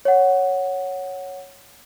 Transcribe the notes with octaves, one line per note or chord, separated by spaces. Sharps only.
C#5 F#5